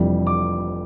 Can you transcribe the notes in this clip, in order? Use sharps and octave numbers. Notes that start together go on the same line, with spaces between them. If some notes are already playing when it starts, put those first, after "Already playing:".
Already playing: F1 F2 E3 G3 D4
D6